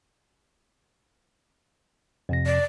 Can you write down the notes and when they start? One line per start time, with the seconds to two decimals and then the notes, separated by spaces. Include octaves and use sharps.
2.29 F2 C3 A#6
2.46 D5